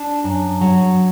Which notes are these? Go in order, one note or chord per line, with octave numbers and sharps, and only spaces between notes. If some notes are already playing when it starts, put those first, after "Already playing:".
Already playing: D4 A5
F#2
F#3